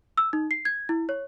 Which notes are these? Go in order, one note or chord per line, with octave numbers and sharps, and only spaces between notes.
E6
D#4
C7
G#6
E4
C#5